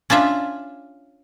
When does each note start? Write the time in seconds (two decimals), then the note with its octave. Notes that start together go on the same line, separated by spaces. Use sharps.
0.10 C#4 D4 F4 E5